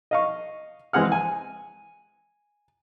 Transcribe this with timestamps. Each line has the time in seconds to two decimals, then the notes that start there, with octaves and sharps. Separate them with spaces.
0.11 D#5 F5 C#6
0.93 E3 G#3 C4 G#4 F#5 F6
1.12 G#5